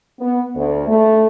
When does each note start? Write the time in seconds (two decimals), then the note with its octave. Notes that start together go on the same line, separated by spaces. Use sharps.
0.19 B3
0.55 D2
0.88 A3